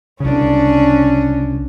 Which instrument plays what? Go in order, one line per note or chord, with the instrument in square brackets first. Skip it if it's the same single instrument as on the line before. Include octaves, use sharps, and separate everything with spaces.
[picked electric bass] C2 C#3 [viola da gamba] C#4 D4